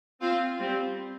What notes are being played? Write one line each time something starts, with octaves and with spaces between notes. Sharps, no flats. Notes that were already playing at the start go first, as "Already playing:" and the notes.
C4 F4
G3 C4